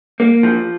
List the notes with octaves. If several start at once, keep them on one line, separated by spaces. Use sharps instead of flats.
A#3
F3